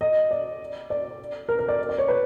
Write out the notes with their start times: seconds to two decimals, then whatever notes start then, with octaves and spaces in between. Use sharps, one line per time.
0.01 D#5
0.31 D5
0.90 D5
1.49 A#4
1.59 A#4
1.68 D5
1.89 D5
1.98 C#5
2.08 B4